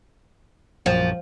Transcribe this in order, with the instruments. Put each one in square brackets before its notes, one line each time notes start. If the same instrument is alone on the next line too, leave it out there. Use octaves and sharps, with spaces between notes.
[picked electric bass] A#1 F#2 [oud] F3